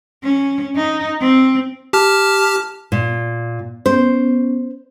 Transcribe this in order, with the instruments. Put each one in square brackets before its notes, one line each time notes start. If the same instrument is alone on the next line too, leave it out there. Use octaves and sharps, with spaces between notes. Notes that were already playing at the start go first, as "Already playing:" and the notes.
[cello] C#4
D#4
C4
[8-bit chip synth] G4 A5 F6
[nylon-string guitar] A#2
[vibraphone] B3 C#4 [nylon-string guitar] C5